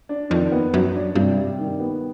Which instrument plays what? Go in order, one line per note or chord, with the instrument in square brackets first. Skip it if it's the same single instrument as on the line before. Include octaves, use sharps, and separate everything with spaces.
[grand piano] D4
[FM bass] F2 [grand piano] D#3
[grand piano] B3
[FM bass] F#2 [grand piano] F#3
[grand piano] D4
[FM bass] G2 [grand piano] C3
[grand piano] G3
D#3
B3